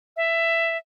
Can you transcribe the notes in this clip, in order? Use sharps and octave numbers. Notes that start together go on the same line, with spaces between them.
E5